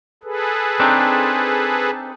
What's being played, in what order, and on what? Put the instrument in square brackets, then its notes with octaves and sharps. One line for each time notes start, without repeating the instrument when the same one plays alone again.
[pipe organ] G#4 A4 B4
[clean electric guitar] C4 D4 D#4